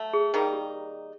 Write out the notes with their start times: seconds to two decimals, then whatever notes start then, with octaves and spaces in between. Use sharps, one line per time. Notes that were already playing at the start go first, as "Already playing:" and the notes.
Already playing: F#3 A3
0.13 G#4
0.34 D#3 G3 A#3 D#4 G#4
0.53 G4